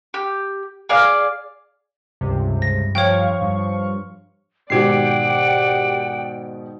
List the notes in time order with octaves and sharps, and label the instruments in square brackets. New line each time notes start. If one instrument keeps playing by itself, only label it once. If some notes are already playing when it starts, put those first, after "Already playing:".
[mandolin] G4
G#4 D5 F5
[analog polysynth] C#2 C3 [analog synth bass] G2
[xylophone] A#6
[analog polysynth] F3 F5 C#6 [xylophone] C#5 G5
[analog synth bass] G2
[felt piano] G#2 B2 D#3 [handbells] G4 C7 [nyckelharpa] D5 F#5 [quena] G5